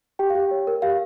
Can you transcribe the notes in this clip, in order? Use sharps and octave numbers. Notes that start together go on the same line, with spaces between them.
G4 G5
F5
G4 G5
C#5
A#4
G4 F5